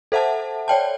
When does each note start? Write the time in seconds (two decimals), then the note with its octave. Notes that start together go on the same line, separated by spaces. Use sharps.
0.12 A4 C5 E5 F#5 A5
0.68 C#5 D5 G5 A5